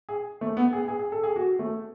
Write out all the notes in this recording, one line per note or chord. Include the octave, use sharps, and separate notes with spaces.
G#4
A3
B3
G#4
G#4
G#4
A4
G#4
F#4
A3